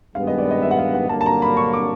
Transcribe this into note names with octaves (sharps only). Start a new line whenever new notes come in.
G2 D#3 G#3 B3 F5
D#5
D5
D#5
E5
F#5
F5
F#5
G2 D3 F#3 A#3 A5
A5
A#5
B5
C#6
D6